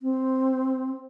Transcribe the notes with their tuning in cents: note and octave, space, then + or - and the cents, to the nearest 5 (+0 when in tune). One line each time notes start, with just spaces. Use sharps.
C4 +0